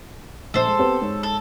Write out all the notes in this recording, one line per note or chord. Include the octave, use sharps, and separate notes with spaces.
A#1 A4 C5 E6
G#3
B3 C4 G4
G#2 C#5
A4